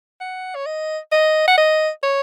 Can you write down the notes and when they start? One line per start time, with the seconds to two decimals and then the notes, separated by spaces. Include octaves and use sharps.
0.21 F#5
0.55 C#5
0.66 D#5
1.12 D#5
1.48 F#5
1.58 D#5
2.03 C#5